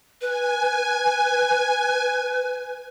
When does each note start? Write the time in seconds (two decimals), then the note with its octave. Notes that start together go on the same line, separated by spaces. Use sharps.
0.21 B4 G#5